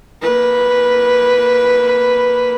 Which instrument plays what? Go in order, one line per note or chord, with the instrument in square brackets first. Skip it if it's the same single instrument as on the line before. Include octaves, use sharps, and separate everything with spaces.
[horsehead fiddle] A#3 B4